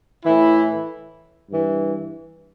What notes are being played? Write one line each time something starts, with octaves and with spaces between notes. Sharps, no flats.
A2 E3 E4
G2 E3